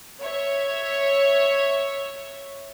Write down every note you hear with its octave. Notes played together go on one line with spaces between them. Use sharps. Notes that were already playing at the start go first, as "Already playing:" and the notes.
C#5 E5